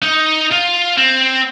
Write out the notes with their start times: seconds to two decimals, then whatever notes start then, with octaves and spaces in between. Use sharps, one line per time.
0.03 D#4
0.51 F4
0.97 C4